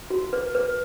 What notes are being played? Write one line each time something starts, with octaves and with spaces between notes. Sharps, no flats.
F#4
B4
B4